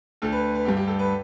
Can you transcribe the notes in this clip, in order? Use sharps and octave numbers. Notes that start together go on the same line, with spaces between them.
D2 D3 A4
B4
B4
G2 D3 G4
G4
A4
B4